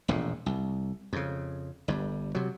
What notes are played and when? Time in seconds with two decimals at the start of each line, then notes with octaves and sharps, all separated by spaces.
0.08 E1 A#1 F2 A2
0.46 C2
1.13 F2 C#3
1.88 G1 G2
2.35 C3 F#3